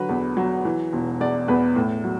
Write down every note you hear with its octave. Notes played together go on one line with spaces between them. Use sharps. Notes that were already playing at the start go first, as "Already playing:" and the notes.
Already playing: D3 F#3 B4
E2
F#3
E3
E1
E2 D5
E2 B4
A2
F#3